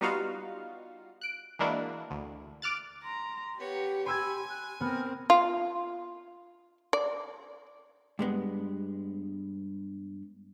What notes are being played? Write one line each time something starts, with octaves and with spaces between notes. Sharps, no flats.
G3 B3 D#4 F4 F#4 F5
F#6 D7
E3 G#3 A#3 D4 E4 F#4
D2
D6 F6 F#6 A6
A#5 C6
B3 G4 C#5
G#5 B5 C6 E6 G#6
F#6
B3 C4 A#4 F6
F4
D5
G2 G#3 B3